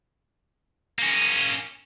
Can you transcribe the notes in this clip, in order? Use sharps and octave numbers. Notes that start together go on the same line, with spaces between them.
A#3 C#4